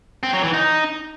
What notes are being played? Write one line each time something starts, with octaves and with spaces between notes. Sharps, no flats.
C4
F#3
E3
D#4